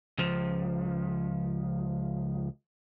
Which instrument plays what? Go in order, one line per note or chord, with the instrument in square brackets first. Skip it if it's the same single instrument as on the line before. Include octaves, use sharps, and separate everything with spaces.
[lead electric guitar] C#2 F3